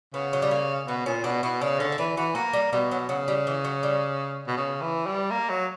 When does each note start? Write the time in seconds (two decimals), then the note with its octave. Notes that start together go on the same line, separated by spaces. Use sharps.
0.14 C#3 B3
0.33 F#3
0.42 G3
0.51 A#3
0.87 B2 B3
1.06 A#2 C#4
1.24 B2 D4
1.43 B2 E4
1.61 C#3 D4
1.80 D3 C#4
1.92 E4
1.98 E3 D4
2.17 E3 F#4
2.35 A#3 F#4
2.53 G3
2.72 B2 G3
2.91 F#3
3.09 C#3 F#3
3.28 G3
3.47 E3
3.64 F#3
3.83 G3
4.47 B2
4.57 C#3
4.82 E3
5.06 G3
5.31 A#3
5.50 F#3